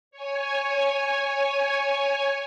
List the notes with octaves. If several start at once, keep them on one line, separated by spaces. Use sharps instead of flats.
C#5 G#5